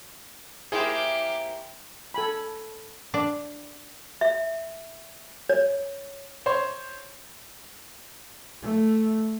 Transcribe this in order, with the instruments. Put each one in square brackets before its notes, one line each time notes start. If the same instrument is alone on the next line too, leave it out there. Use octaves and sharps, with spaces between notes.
[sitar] A#3 E4 C5 [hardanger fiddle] G4 [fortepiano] G#4
[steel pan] A4 G#5 B5
[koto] D4
[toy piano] E5
C#5
[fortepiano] C5 C#5 C6
[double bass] A3